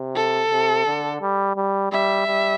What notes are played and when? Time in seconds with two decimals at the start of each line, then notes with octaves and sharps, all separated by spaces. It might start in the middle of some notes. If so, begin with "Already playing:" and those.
Already playing: C3
0.15 A4
0.51 C3
0.86 D3
1.21 G3
1.56 G3
1.92 G3 E5
2.27 G3